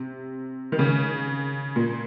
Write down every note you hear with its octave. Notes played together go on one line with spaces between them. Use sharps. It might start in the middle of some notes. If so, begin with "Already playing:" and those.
Already playing: C3
D#3
C#3
A#2